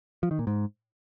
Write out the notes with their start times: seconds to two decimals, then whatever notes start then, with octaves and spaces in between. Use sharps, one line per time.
0.23 F3
0.31 D#3
0.39 A#2
0.47 G#2